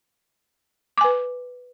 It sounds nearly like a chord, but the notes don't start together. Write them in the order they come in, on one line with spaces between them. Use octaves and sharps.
D6 G#5 B4